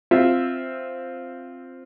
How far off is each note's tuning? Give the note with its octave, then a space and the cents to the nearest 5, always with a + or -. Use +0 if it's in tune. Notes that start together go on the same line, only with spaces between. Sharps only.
C4 +0 F4 +0 E5 +0